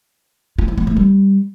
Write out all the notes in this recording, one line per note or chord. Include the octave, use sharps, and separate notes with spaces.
F4
E4
B3
A3
G3